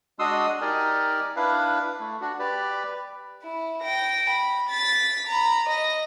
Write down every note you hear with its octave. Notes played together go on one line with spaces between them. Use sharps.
G#3 D4 F#4 C6 D#6 E6
D#4 G4 A#4 D5 G#5
D4 E4 B4 F5
A3
D4 F#4
G4 B4 D5
E4
G5 A#6
B5
A6 B6
A#5 B5
D#5 A#6